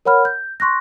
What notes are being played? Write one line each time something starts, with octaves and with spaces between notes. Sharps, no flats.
A#4 C#5 F#5 B5 F6
G6
C6 C#6 F#6 A#6